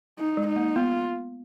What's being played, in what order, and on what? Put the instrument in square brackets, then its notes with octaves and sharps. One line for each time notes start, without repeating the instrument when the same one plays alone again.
[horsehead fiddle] D#4
[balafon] G#3
[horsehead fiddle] D#4
[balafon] A#3
[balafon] B3 [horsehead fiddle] F4